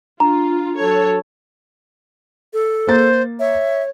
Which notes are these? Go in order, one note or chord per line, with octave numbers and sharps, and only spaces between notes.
D4 F4 A#5
F#3 A4 C#5
A4
A#3 C5 A6
C#5 E5